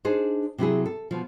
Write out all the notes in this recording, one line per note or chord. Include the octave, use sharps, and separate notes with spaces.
D4 D#4 G#4 C5
C3 F#3 E4 G#4
A4
B2 F3